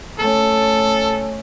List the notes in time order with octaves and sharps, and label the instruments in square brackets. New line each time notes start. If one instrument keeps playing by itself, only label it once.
[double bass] A3 C#4 [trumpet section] A4